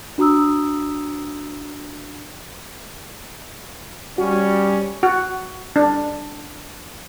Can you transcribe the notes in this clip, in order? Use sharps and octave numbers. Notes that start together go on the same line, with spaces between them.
D4 F#4 A#5 D#6 E6
G3 C#4 F#4
F#4
D4